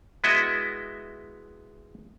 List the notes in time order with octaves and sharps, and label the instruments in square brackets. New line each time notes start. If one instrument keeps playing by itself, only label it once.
[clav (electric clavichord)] G#3 B3 E4 F#4 D#5 E5